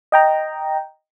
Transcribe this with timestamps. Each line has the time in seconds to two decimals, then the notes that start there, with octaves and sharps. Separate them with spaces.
0.12 D#5 G5 A#5